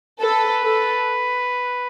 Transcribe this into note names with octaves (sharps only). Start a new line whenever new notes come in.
A4 B4
A4